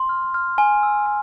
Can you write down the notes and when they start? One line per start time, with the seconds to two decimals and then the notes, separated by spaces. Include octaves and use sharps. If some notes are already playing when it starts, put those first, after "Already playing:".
Already playing: C6
0.09 F6
0.34 F6
0.58 G#5
0.83 E6
1.06 G#5